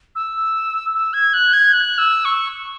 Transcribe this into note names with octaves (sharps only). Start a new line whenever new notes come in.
E6
E6
G#6
F#6
G#6
F#6
E6
C#6